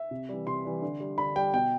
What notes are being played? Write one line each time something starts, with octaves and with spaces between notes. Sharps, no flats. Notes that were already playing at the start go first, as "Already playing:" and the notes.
Already playing: E5
C3
E3 G3
C3 C6
E3 G3
D3
G3
D3 B5
G3 G5
B2 G5